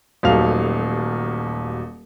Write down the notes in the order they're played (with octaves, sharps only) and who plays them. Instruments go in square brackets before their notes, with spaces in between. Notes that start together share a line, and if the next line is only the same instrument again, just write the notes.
[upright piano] D#1 D#2 F#3 A3 F5 F7